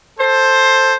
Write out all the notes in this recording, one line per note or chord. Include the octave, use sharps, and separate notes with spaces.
A4 C5